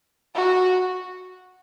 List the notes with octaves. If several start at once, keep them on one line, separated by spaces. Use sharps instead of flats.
F#4